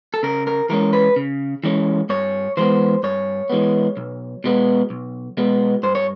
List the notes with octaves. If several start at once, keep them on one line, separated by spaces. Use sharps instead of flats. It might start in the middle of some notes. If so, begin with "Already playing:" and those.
A4
C#3 A#4
A#4
E3 G#3 C#4 A#4
B4
C#3
E3 G#3 C#4
G2 C#5
E3 G#3 B3 C5
G2 C#5
E3 G#3 B3
B1
B2 G#3 B3
B1
B2 G#3 B3
G2 C5
C#5